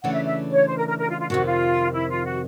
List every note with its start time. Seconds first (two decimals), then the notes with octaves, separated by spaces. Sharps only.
0.03 C#3 E3 A3 D4 F#5
0.14 E5
0.24 E5
0.51 C#5
0.67 C5
0.77 A#4
0.87 A#4
0.98 A#4
1.09 F4
1.19 F4
1.29 F2 C3 D#3 F#4
1.46 F4
1.93 E4
2.09 F4
2.25 F#4